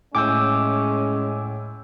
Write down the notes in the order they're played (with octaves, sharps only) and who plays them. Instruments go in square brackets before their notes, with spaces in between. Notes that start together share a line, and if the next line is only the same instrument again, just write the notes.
[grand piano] A2 G#5 G6 [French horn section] G#3 C#4 [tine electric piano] D6 E6